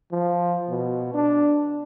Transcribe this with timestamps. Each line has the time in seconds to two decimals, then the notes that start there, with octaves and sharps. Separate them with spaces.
0.12 F3
0.69 B2
1.14 D4